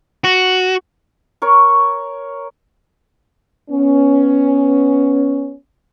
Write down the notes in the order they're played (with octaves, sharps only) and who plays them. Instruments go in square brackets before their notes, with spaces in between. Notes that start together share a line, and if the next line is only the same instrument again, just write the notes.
[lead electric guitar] F#4
[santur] A#4 C#5 C#6
[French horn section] B3 C#4